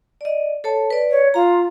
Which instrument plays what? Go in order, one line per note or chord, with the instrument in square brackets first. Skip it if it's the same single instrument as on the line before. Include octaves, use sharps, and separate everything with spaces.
[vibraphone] D5 D#5
A4 C#5 A5
B4 D5
[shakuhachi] C#5
[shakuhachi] F4 [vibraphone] F5 A#5